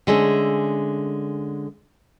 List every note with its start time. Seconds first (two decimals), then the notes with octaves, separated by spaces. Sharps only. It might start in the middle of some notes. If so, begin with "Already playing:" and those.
0.07 D3 G#3 A3 C#4